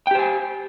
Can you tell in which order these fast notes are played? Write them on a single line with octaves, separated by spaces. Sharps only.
G5 G4 C5 G#5